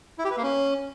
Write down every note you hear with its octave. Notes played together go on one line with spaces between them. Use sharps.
E4
G4
B4
A#3
C#4